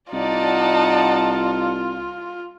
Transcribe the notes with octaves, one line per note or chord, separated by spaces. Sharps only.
C2 D#4 F4 D5 F#5 A5